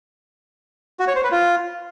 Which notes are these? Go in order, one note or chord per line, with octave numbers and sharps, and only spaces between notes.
F#4
C#5
C5
B4
F4